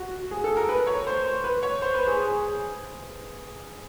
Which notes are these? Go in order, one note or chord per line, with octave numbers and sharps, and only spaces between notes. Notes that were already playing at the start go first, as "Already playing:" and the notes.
Already playing: F#4
G#4
A4
A#4
B4
C#5
C5
B4
C#5
C5
B4
G#4
G#4